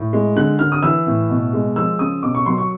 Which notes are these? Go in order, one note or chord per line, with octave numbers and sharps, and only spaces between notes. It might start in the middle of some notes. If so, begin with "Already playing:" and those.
Already playing: A2
G#3
D3 F#6
D3 F6
D#6
E3 E6
A2
B2
G#3
F3 E6
C#3 D#6
B2 D6
C#6
F#3 C6
C#6